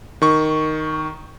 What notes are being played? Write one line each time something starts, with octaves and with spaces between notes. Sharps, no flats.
D#3 C#6